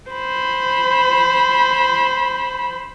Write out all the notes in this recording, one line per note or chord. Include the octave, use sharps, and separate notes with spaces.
C5 B5